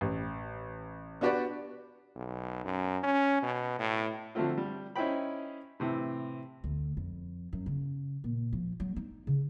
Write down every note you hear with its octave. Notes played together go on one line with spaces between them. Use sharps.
A1
B3 D4 F#4 G4 B4 D5
B1
F#2
C#4
B2
A2
D3 F3 F#3 A3 C4 F4
G3
C#4 D#4 E4 C5 G5 B5
A2 C3 E3
D2
F2
F#2
C#3
A#2
F3
F#3
D#4
C#3